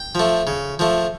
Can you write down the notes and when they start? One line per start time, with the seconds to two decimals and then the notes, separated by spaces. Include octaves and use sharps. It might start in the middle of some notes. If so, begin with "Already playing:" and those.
Already playing: G5
0.15 F3 A3
0.47 C#3
0.79 F3 A3